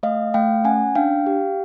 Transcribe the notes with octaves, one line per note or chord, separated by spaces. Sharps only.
A3 D#5 F5
A3 F5 G5
C#4 F#5 G#5
D4 F5 G5
G4